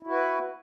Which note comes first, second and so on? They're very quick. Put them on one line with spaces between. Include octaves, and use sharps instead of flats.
E4 F#4 B4